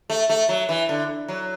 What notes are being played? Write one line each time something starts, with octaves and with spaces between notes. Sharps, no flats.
A3
A3
F#3
E3
D3
F#3